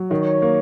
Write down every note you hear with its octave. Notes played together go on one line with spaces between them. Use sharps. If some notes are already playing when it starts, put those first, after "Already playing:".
Already playing: F#3
D#3 C#5
A#3